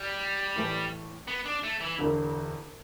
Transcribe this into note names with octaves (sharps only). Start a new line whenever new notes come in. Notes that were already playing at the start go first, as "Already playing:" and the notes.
Already playing: G3
A2 E3 A3
B3
D4
A3
E3
E1 D2 D3